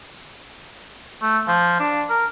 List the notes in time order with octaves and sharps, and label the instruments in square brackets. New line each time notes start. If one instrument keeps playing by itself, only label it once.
[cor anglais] A3
F3
D4
A#4